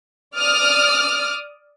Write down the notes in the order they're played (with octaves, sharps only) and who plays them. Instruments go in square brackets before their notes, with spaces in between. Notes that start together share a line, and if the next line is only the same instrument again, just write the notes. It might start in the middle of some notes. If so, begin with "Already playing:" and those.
[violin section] D5 D6 D#6 F6